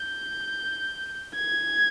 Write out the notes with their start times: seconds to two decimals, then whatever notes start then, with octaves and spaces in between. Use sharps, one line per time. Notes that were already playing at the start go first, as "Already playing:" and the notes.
Already playing: G6
1.36 G#6